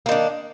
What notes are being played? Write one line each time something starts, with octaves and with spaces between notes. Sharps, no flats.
D#3 A#3 D4